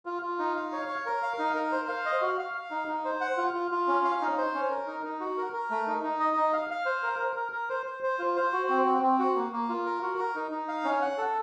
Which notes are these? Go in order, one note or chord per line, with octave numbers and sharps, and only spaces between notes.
F4
F4
D#4
F5
C#5
C#5
A#4
F5
D#4
A#4
C5
F5
D#5
F#4
F5
F5
D#4
D#4
C5
F#5
F4
F4
F4
C#4
F5
D#4
C5
C#4
A#4
D#4
D#4
F#4
A#4
A#4
A3
D#4
D#4
D#5
D#4
F5
F5
C5
A#4
A#4
A#4
A#4
C5
C5
C5
F4
C5
F#4
C4
C4
C4
F#4
A#3
A#3
F4
A#4
F#4
A#4
D#4
D#4
F5
C#4
F#5
A4